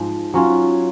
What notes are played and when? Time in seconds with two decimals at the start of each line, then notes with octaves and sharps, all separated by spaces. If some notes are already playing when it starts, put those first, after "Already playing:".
Already playing: G#2 F3 G#3
0.34 F#3 C#4 F4